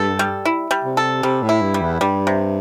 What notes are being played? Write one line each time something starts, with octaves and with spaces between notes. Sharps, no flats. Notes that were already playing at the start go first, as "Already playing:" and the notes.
Already playing: G2 A4
G3
E4
G3
C3
A4
C3 G3
A2
E4
G2
G3
E2
G2 G3
C3